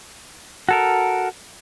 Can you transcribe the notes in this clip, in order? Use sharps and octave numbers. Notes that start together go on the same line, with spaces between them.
F#4 A4 A#4